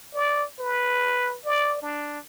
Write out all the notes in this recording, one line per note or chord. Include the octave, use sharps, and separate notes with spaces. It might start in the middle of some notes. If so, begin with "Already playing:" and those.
D5
B4
D5
D4